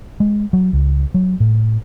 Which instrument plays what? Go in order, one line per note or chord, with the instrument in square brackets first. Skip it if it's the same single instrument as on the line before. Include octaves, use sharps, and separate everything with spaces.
[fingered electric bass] G#3
F#3
C#2
F#3
A2